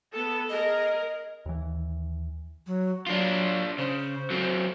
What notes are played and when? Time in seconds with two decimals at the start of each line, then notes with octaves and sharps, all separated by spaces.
0.12 B3 A4
0.49 G#4 A#4 D#5
1.46 D#2 E3
2.67 F#3
3.07 F#3 D4 F4
3.78 C#3 C5
4.30 F#3 C4